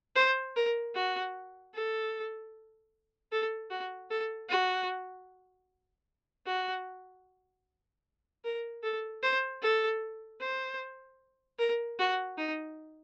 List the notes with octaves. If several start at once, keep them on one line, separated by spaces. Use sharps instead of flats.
C5
A#4
F#4
A4
A4
F#4
A4
F#4
F#4
A#4
A4
C5
A4
C5
A#4
F#4
D#4